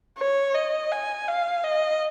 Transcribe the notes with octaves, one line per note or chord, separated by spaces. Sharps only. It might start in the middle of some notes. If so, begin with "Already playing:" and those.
C#5
D#5
G#5
F5
D#5